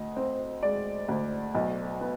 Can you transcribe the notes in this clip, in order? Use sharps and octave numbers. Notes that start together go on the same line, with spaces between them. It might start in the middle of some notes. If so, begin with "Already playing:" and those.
Already playing: D2 D#5
C4
G#3 D5
D2
B1
B3